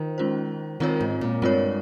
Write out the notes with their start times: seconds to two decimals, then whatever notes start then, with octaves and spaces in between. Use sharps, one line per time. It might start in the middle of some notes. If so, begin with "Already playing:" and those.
Already playing: D#3 F4 C5
0.18 G#3 C#4 F4 C5
0.80 D#3 G#3 C4 F4 A#4 C#5
1.01 G#2
1.21 A#2
1.42 G2 G#3 C4 F4 A#4 C#5